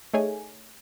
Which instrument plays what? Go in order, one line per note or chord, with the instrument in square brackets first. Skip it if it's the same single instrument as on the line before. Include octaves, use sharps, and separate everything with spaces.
[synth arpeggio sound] A3 D#4 G#4 C#5 G#5